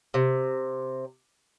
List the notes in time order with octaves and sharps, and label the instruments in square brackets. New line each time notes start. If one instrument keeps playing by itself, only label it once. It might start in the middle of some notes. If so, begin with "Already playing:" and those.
[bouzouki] C3